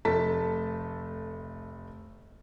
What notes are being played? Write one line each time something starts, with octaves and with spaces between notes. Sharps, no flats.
F1 A3 A5 B6